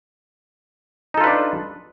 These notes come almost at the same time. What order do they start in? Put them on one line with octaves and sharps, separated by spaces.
D#4 A4 F4 B4 D4